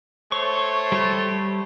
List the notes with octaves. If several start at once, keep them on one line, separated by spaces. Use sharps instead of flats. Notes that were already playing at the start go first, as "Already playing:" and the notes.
A3 C5 C#5 C#6
G3 G4 A4